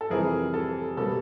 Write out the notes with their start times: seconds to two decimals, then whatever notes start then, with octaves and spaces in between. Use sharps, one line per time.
0.01 A4
0.10 F2 C3 E3 G3 G#4 A#4
0.54 A4
0.97 B2 G3 A#3 A4